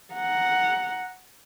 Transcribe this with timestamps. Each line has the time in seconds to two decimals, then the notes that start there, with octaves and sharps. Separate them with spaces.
0.13 F#5 A#5